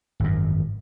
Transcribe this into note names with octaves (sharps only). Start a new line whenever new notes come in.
G#1 F#2